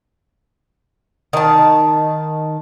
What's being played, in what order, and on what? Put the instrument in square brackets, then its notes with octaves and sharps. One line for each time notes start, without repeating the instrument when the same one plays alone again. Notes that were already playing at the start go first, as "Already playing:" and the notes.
[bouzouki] D#3 A5